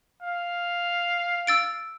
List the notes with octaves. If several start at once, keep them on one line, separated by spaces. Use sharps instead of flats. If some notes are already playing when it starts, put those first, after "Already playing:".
F5
E6 A6 D7